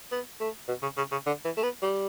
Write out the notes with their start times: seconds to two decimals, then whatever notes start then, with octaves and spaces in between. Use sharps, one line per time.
0.11 B3
0.40 A3
0.68 B2
0.82 C#3
0.97 C#3
1.11 C#3
1.26 D3
1.45 E3
1.57 A3
1.63 B3
1.82 G3